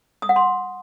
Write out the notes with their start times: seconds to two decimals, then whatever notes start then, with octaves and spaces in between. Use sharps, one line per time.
0.22 D#6
0.29 F#5
0.36 C6